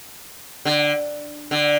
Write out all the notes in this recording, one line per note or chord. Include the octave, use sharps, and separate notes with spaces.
D3
D3